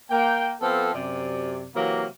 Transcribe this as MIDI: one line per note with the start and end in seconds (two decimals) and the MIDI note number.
0.10 0.52 58
0.10 0.52 79
0.61 0.94 53
0.61 0.94 59
0.61 0.94 60
0.61 0.94 69
0.94 1.66 42
0.94 1.66 48
0.94 1.66 74
1.74 2.05 48
1.74 2.05 52
1.74 2.05 54
1.74 2.05 58